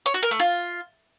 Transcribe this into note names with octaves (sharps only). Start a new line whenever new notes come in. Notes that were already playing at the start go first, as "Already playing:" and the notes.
C#5
F#4
A#4
A3
F4